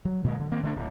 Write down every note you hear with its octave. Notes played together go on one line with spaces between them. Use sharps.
F#3
A#2 D3 F#3 G#3
D3
D#3 A#3 C4
D3 A3 D4
D1 D2